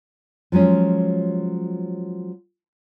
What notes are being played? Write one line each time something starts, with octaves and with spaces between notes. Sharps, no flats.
F3 F#3 G#3 C#4